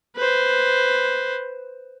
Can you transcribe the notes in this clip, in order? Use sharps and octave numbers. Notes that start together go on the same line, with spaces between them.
B4 C5